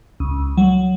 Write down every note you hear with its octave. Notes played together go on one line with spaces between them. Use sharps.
C#2
F#3